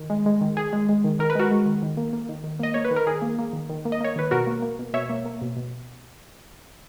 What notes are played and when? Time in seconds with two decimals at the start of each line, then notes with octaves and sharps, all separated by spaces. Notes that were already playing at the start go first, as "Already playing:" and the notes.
Already playing: D#3
0.10 G#3
0.26 G#3
0.41 D#3
0.57 D#3 G#4
0.73 G#3
0.89 G#3
1.04 D#3
1.19 D#3 A#4
1.30 B4
1.35 G#3 F#4 A#4
1.51 G#3
1.66 D#3
1.83 D#3
1.97 A#3
2.13 A#3
2.29 D#3
2.44 D#3
2.60 A#3 D#5
2.74 A#3 C#5
2.85 B4
2.91 D#3
2.96 A#4
3.07 D#3 G#4
3.22 A#3
3.39 A#3
3.53 D#3
3.70 D#3
3.85 A#3
3.92 D#5
4.01 A#3 C#5
4.16 D#3 B4
4.31 B2 F#4 A#4
4.47 A#3
4.62 A#3
4.79 B2
4.94 B2 C#5 E5
5.10 A#3
5.25 A#3
5.42 B2
5.57 B2